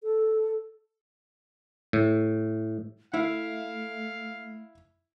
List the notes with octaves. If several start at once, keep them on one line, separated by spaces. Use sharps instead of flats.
A4
A2
A3 E4 E5 F5